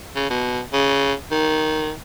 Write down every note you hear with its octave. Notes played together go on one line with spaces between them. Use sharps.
C#3
B2
C#3
D#3